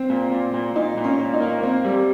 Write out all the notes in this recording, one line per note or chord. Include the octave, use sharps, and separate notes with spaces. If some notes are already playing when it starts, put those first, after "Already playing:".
Already playing: C4
A#2
A#2
A#2
A#2 D#4
A#2
C#4
A#2
D#4
A#3
A#3 C4
G3